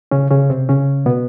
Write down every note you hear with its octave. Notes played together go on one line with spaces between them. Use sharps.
C#3 C#4
C#3 C#4
C3 C4
C#3 C#4
B2 B3